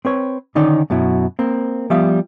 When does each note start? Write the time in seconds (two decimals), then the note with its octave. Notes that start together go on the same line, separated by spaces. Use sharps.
0.05 C4 B4 C#5
0.55 D3 D#3 C#4 D#4 D5
0.90 F#2 B2 F#3 E4
1.39 A#3 C4
1.90 F3 G3 B3 E5 F5